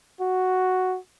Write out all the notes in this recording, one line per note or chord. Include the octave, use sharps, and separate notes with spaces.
F#4